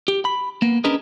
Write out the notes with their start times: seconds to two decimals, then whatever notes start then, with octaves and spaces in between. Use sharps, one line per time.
0.08 G4
0.25 B5
0.62 A#3 B3
0.84 C#4 D4 G#4 A#4 B4 D#5